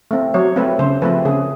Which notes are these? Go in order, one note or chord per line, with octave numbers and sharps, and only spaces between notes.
A3 C4
F#3 C#5
A3 C4 B4
C#3 C5
F3 A3 C4 B4
C#3 G#4